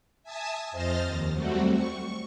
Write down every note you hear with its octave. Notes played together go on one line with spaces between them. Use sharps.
E5 G#5 A5 D#6 E6
F2 C5 D#5 F6 A6 A#6
D#2
F#3 G3 A3 C4 F#4
C#6